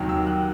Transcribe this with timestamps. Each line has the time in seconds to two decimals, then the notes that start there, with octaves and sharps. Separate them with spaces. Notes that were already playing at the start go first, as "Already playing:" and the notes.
Already playing: D#2 D#3 F#3
0.09 E6
0.27 F#6